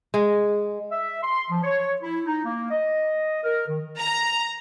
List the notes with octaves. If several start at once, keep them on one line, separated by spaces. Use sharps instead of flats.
G#3
E5
C6
F3
C#5
E4
D#4
A#3
D#5
A#4
D#3
A#5